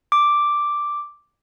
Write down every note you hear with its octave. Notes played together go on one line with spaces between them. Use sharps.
D6